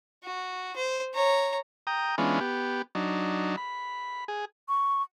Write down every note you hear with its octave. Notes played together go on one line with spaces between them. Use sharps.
F#4
C5
C#5 A#5
G5 A#5 D#6
E3 G#3 B3 C#4 D4 F4
B3 G4
F#3 D4 D#4
B5
G#4
C#6